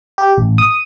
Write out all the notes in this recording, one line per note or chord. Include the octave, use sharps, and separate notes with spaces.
G4
A1
D#6